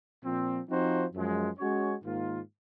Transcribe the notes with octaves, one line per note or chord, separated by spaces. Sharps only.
A#2 F3 C4
F3 C4 D#4 F#4 C5
F#2 F3 G#3
G#3 C#4 F#4 C#5
G#2 D#3 A#3 F4